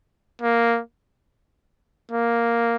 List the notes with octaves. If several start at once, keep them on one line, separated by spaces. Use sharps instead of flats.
A#3
A#3